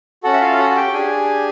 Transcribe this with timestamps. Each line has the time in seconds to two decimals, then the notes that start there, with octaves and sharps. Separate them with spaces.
0.23 C#4 F#4 A4 F#5
0.33 E5
0.41 F4 F5
0.58 F#4 F#5
0.71 F#5
0.76 G4 G5
0.94 D4 G4 G#4 G#5